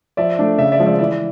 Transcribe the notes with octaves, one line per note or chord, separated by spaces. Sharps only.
F3 D5 E5
A3 D4
C#3 D5 E5
D5 E5
F3 G#3
D5 E5
E3 D5 E5